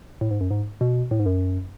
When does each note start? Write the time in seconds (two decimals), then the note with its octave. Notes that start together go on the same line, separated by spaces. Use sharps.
0.21 A2
0.31 G#2
0.41 F#2
0.50 G#2
0.81 B2
1.11 A2
1.20 G#2
1.26 F#2